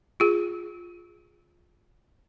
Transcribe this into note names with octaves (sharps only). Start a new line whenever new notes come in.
F4 G#4